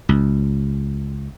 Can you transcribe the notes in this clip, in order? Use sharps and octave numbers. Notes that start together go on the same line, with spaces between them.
C#2